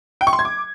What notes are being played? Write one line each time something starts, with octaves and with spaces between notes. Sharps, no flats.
G5
C#6
C6
G#6
D6